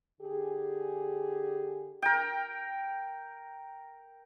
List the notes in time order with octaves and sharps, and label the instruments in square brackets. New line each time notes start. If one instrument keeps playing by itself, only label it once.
[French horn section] D3 G4 G#4
[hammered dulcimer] A#4 G5